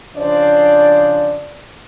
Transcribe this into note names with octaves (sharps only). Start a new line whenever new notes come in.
C#3 F3 D4 C5 D5